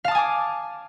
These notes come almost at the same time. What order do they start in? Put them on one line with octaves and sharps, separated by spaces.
F5 A5 D#6 G#5 D6